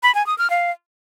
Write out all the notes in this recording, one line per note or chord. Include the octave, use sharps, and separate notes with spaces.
B5
G#5
D#6
F6
F5